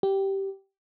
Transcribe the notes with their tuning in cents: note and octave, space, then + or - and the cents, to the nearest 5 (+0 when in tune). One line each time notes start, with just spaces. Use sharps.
G4 -10